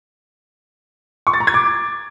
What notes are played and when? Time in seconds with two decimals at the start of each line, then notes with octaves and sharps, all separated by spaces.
1.27 C#6
1.33 A6
1.40 A#5
1.47 G#6
1.54 D6